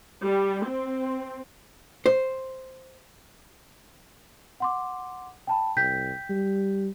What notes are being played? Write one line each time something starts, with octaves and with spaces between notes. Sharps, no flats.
G3
C4
C5
F#5 C6 D6
G5 A5 B5
C2 G5 G6 B6
G3